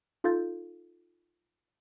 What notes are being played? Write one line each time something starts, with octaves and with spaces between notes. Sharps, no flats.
D#4 F4 A4 F5 G6 A6